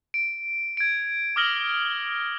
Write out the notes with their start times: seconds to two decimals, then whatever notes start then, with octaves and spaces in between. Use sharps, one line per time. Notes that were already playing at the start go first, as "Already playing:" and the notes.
0.14 D7
0.77 G#6 D7
1.36 D6 D#6 F6 A#6 F#7 G7